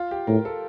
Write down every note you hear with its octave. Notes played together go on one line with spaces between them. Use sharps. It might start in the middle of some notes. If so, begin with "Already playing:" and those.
Already playing: F4
G4
A2 A#4
A4